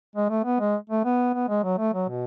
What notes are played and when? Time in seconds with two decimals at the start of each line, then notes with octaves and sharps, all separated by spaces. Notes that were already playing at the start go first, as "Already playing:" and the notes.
0.16 G#3
0.30 A3
0.44 B3
0.60 G#3
0.90 A3
1.04 B3
1.34 B3
1.49 G#3
1.64 F#3
1.78 A3
1.94 F#3
2.09 B2